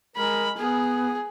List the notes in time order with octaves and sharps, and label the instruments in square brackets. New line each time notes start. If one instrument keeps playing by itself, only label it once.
[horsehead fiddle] G#3 B5 [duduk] A#4
[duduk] B3 [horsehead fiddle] G#4